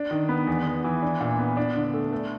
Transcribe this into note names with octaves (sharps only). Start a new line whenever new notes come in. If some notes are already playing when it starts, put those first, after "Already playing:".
Already playing: D4
D#3
B3
E2
E2
E3
D4
A#2
B3
D4
D3
A3
A3